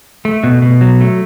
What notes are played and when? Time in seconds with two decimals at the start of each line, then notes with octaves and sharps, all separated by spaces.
0.25 A3
0.44 B2
0.62 B2
0.81 F#3
1.01 A3